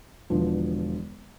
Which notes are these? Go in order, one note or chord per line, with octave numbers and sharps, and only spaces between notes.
E1 E2 D3 F3